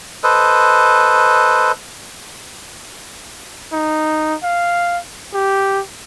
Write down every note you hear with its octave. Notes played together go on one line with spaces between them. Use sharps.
A4 B4 C5 D#5
D#4
F5
G4